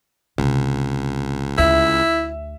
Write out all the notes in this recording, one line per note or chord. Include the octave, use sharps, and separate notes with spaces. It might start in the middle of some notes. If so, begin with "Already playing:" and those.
C#2 C3
D2 E4 E5